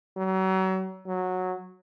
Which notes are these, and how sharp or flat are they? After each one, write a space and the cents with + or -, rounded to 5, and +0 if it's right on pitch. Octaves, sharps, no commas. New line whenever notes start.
F#3 +35
F#3 -10